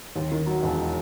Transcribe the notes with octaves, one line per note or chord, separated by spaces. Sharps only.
D#2
D#3
F#3
E1